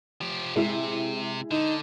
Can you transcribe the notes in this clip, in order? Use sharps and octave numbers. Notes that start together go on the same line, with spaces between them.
F3 G4
C3 G#3 E4 G#4
D3 D#4